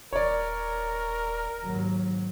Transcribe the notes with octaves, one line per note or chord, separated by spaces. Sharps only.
D#1 A#4 C#5 D5
D#2 G#2 F#3